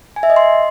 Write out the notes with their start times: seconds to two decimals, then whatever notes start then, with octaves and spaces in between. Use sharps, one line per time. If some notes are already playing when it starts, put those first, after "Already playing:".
0.16 G#5
0.23 E5
0.30 D#5
0.36 C6